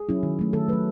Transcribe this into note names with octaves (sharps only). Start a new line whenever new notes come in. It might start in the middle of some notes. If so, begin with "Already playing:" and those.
Already playing: G#4
F#3 C#4 E4
D#3
F#3 A3
D#3 A4
F#3 A3 B4